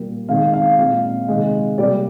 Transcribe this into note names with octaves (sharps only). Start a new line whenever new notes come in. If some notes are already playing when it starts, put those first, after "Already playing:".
Already playing: A#2 G3 A#3
D#3 G#3 C4 F5
F5
A#2 G#3 C4 F5
C3 D#3 G#3
C3 G3 A#3 D5